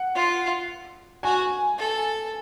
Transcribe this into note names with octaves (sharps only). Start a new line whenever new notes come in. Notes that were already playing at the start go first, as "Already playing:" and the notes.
Already playing: F#5
F4
F#4 G#5
A4